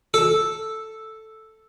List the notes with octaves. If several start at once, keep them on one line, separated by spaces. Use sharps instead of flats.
A4